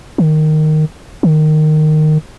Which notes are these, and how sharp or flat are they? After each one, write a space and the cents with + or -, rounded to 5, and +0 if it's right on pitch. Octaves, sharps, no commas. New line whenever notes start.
D#3 -10
D#3 -15